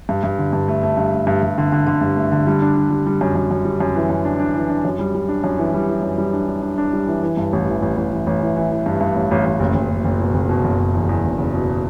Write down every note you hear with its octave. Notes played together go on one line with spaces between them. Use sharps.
G2
G2
D3
G2
A3
A3
G2
A3
G2
G2
D3
D3
D3
G2
A3
D3
G3
D4
D4
G3
G3
F#2
F#2
F#2
G3
F#2
E3
F#2
D4
D4
E3
D4
F#2
G3
G3
D4
F#2
E3
G3
E3
F#2
G3
D4
D4
D4
D4
G3
E3
E3
G2
A1
E3
A1
A1
E3
A1
E3
E3
E3
G2
G2
A1
A1
A1
F#1
F#1
F#1
F#1
B2
F#1
B2
F#1
F#1
E2
E2
F#1
F#1
B2